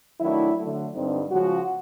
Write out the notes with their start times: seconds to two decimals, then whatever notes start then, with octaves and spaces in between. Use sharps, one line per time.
0.19 D#3 F#3 A3 D4 E4
0.57 D3 F#3 A3
0.93 G2 D3 G3 C4 D#4
1.30 C#3 F3 G#3 C#4 F#4